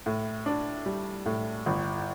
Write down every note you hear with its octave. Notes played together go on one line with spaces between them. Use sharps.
A2
D4
G3
A2
G1